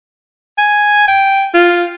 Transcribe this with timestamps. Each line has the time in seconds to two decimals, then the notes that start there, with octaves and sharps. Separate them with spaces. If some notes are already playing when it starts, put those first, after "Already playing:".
0.58 G#5
1.08 G5
1.54 F4